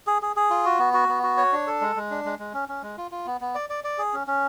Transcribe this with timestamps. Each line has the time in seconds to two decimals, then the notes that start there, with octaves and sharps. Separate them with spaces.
0.07 G#4
0.22 G#4
0.36 G#4
0.50 F4
0.65 F#4
0.79 B3
0.94 F#4
1.08 B3
1.23 F#4
1.37 C#5
1.52 D4
1.67 A4
1.81 G#3
1.96 G#3
2.10 D4
2.25 G#3
2.39 G#3
2.54 C#4
2.69 C#4
2.82 G#3
2.98 F4
3.11 F4
3.26 B3
3.41 B3
3.55 D5
3.70 D5
3.84 D5
3.98 G#4
4.13 C#4
4.27 C#4